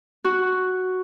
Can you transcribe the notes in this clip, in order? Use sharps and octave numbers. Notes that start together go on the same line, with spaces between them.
F#4